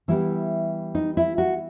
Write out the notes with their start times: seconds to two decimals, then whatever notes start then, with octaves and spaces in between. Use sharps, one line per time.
0.08 E3 G3 B3 E4
0.95 D#4
1.17 E4
1.38 F#4